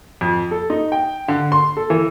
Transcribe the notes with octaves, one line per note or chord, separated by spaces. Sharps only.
F2
A4
D#4
G5
D3
C6
A4
E3